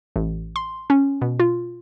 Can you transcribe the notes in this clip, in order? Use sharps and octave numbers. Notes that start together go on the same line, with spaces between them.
A1
C6
C#4
B2
F4